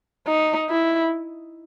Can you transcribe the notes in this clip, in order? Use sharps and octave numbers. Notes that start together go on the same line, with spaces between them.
D#4
E4